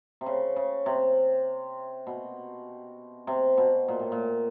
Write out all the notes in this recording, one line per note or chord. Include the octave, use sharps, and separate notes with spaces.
C3
C#3
C#3
C3
B2
C3
B2
A#2
A2
A#2